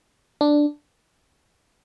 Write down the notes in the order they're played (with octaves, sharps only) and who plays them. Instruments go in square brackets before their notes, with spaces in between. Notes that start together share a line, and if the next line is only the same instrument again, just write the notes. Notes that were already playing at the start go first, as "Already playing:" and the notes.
[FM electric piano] D4